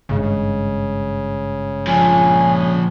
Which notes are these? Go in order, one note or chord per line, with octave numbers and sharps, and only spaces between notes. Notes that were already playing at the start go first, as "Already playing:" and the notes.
G#1 G2 C#3 G#3
A#2 F3 G#5